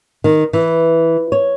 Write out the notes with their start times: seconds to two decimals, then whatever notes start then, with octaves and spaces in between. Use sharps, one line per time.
0.24 D#3
0.53 E3
1.32 C#5